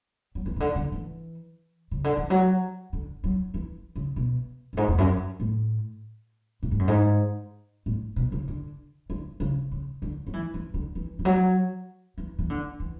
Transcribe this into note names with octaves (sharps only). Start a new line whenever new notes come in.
F#3
E3
C#3
D3
D3
E3
C#3
D3
E3
F#3
D3
F#3
E3
C#3
B2
F#2
G#2
E2
F#2
A2
A2
G#2
F#2
G#2
A2
B2
C#3
D3
D3
C#3
C#3
D3
F#3
E3
E3
D3
E3
E3
F#3
E3
E3
D3
E3